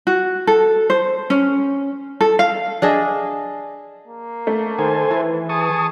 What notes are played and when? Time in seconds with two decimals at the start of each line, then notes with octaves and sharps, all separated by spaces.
0.07 F#4
0.47 A4
0.90 C5
1.30 C#4
2.21 A4
2.39 F5
2.82 D4 G#4 D#5 E5
4.08 A#3
4.47 A3
4.79 D#3 A4 C5 G#5
5.10 E3
5.49 G#4 A5 C#6 D#6